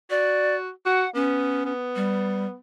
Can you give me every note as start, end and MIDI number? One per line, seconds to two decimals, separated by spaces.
0.10 0.70 66
0.10 0.56 74
0.86 1.04 66
0.86 1.10 78
1.15 1.62 59
1.15 1.72 61
1.65 2.56 59
1.96 2.45 55